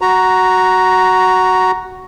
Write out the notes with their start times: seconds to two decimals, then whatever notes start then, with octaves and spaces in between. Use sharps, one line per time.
0.01 F#4 A#5